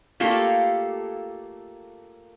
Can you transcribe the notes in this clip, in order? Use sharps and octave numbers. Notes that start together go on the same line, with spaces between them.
A3 A#3 F4 G4 A4